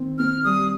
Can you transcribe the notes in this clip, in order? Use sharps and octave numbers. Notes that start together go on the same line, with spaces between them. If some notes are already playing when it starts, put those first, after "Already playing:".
Already playing: D#3 C4
C4 F6
G3 D#6